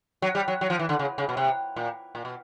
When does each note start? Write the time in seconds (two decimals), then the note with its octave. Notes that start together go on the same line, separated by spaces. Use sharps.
0.22 F#3
0.35 G3
0.48 F#3
0.61 F#3
0.70 F3
0.79 E3
0.89 D3
0.99 C#3
1.18 C#3
1.29 B2
1.37 C3
1.76 A#2
2.15 A#2
2.25 B2